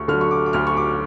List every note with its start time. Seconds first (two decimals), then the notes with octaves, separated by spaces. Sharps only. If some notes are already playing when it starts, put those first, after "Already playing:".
Already playing: D2 C#6
0.08 D3 F#3 F6
0.21 C#6
0.31 D6
0.46 D6
0.53 D2 F6
0.67 C#6
0.77 D6